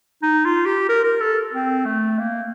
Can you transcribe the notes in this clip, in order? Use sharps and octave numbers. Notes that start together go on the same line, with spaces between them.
D#4
F4
G4
A#4
A#4
A4
C4
A3
A#3